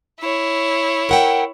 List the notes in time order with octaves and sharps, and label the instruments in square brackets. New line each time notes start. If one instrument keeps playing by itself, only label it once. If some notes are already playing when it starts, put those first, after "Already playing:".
[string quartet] E4 C#5
[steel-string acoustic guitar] A#4 F#5 G5